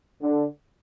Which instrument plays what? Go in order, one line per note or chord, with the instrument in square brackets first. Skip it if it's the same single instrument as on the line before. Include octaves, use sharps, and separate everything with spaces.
[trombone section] D3